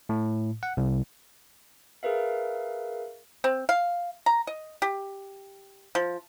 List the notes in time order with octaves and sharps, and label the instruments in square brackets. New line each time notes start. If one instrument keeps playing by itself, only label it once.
[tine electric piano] A2
F#5
C2
[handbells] G#4 A#4 B4 E5 F5
[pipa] C4
F5
A#5
D#5
G4
F3